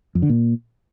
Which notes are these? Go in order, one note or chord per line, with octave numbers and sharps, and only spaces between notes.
F2
D3
A#2